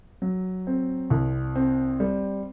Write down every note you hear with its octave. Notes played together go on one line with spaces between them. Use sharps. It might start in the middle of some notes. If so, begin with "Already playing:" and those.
F#3
C4
C2
C4
G3